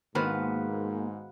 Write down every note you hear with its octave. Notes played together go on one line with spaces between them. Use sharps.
G#2 D#3 A#3 B3 F#4 B4 C5 F5